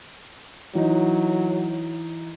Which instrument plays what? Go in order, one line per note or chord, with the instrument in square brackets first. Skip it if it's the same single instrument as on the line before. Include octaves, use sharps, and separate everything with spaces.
[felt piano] E3 D#4 [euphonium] F#3